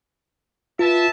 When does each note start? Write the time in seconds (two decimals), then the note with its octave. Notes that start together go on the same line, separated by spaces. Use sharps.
0.79 F4 B4 E5 A5